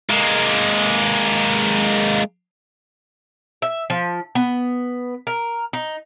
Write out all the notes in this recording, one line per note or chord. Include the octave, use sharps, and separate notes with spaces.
G#3 A#3
E5
F3
B3
A#4
D#4